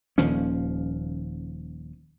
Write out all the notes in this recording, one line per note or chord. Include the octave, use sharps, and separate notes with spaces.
D#1 D#2 F3 C#4